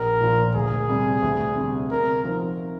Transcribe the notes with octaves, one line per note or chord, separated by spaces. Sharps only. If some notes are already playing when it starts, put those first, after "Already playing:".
Already playing: A#1 A#4
A#2 F3
D2 G#4
C3 G3
D2
C3 G3 D4
C3 A#4
F3 C4 D#4 A#4